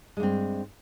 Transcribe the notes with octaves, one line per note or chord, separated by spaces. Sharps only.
G2 G#3 C4